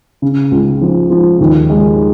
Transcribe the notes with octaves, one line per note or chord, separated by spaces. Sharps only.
C#3
C#2
F3
F3
D#2
G#3